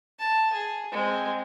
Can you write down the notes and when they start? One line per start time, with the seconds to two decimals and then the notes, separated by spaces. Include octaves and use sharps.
0.19 A5
0.53 G#4
0.92 G#3 C4